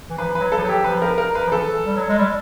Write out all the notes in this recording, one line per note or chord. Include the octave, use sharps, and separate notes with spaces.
E3
F3 B4
B4
F#3
A4
F3
F#3
G4
F3 B4
A#4
A#4
B4
F3
E3 A4
G3
F#3
G#3
G3